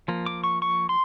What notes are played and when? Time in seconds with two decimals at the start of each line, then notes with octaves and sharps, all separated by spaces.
0.08 F3 A#3
0.26 D6
0.44 C#6
0.62 C#6
0.89 C6